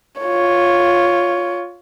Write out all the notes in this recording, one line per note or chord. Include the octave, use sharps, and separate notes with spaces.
F4 C#5